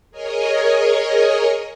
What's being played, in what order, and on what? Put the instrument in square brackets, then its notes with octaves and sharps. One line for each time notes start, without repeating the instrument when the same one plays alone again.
[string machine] G#4 A#4 C#5 D#5 G#5